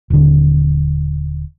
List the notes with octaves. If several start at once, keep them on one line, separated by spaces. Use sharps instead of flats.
D#1 D3